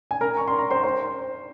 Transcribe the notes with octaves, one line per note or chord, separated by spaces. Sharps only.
G#5
A#4 A#5
C#6
C6
A#5
C5 C6
C5 C6